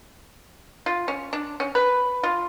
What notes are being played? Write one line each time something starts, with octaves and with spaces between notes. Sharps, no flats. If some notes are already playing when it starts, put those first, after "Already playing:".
F4
C#4
D4
C#4
B4
F4